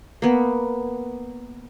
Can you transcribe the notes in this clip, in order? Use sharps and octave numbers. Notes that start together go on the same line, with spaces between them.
A#3 B3